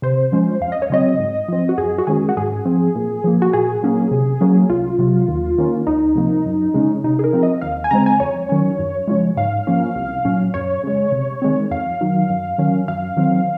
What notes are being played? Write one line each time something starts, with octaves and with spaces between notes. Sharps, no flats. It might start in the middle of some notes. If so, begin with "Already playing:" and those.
C3 C5
F3 G#3 C#4
F2 F5
D#5
C#5
C#3 F#3 C4 D#5
G#2
F3 C4
F#4
F#2 G#4
F#4
D#3 G#3 C#4 G#4
F#4
G#2 G#4
F3 C4
A#2
F3 A#3
F#4
A#2 G#4
F#3 A#3 C#4
C3
F#3 A#3 C#4
C2 F4
C3 F#3
D#2
D#3 A#3 C#4
C#2 D#4
C3 F3 A#3
F#2
C#3 G#3 C#4
C3 D#4
G#4
A#4
F3 C4
D#5
D#2 F5
G#5
C#3 G#3 C4 A#5
G#5
F2 C#5
D#3 F#3 C#4
F#2
C#3 F3 G#3
G#2 F5
F3 A#3 C#4
C2
A#2 F#3 C#4
F#2 C#5
C#3 G#3
C3
D#3 G#3 C4
F2 F5
D#3 F#3
F#2
D#3 F#3 C#4
F#2 F5
D#3 F#3 C4